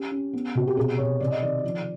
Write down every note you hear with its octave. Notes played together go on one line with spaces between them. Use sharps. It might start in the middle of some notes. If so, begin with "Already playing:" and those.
Already playing: C#4 G4
C#4
B3
C3 F#4
G4
B2 G#4
B2 C#5
C3 D5
D#5
D#3 D5
F3